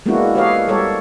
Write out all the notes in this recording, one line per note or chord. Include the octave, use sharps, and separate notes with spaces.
G#3 A#3 B3 D4 E4 F#4
G4 A4 B4 C#5 D#5 F5
G3 G4 A4 A#4 C#5